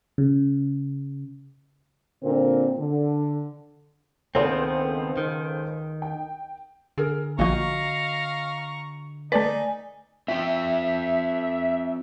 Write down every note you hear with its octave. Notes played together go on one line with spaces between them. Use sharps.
C#3
A#2 D3 C4 A#4
D3
C#2 D#3 B3 C4 A4 C5
D#3
G5
D3 G#4 A#4
A#1 F3 F#4 D#5 F5 A#5 C#6
A3 D#4 B4 D5 G#5
C4 F4 E5 G5